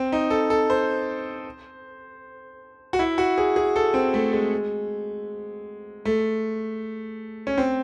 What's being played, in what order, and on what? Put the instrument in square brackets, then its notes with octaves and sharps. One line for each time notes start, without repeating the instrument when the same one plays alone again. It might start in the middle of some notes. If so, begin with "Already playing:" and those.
Already playing: [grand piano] C4
D#4
A4
A4
C5
F#4
E4
F#4
G#4
G#4
A4
C4
A3
G#3
A3
C#4
C4